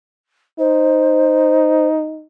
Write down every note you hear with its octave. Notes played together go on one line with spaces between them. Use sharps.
D#4 C5